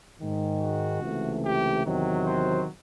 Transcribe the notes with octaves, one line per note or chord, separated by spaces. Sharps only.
G#2 D#3 G#3
F#4
C#2 C3 E3 A3
G4
E2 C3 D#3 F#3
C5